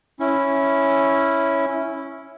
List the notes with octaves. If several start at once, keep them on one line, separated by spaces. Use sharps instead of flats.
C#4 E4